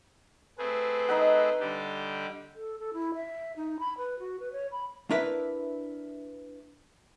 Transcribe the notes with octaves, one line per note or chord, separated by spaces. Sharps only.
A3 C4 G#4 B4
D#4 D#5 F#5
D3 G3 G4
A4
A4
E4
E5
D#4
B5
B4
F#4
B4
C#5
B5
D4 E4 A#4 B4 E5